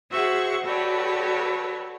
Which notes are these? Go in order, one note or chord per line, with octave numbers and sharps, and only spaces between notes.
F#4 G#4 C5 E5 F#5 C#6
F#4 G4 A4 B4 C#5 D5